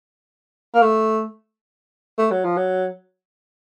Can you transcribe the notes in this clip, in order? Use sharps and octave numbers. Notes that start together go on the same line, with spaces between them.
A#3
A3
A3
F#3
F3
F#3